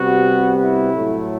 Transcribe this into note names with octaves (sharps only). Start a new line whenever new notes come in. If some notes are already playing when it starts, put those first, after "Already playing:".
Already playing: C3 G3 B3 F#4
E4
A2 F#3 A3